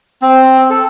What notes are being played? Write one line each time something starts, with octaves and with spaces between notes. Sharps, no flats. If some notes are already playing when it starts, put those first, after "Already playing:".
C4
A4